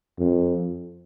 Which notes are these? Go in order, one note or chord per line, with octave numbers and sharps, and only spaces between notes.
F2